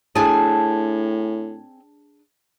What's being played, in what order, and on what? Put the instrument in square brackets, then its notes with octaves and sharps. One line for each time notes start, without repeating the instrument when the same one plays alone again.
[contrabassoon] A2 [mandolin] C4 G#5 A5 [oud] D4 G#4